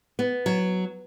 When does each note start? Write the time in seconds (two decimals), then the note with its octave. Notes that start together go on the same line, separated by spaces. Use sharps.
0.19 B3
0.46 F#3